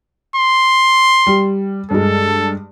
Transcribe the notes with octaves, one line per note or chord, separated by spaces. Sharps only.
C6
G3
G2 G#3 A4